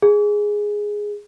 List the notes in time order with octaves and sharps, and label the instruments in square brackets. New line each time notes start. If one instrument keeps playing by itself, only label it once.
[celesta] G#4